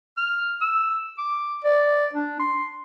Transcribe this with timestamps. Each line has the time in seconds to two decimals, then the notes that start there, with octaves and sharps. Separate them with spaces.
0.17 F6
0.61 E6
1.18 D6
1.64 D5
2.13 D4
2.39 C6